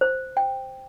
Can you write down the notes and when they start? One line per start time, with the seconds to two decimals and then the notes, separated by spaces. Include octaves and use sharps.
0.01 C5
0.37 G5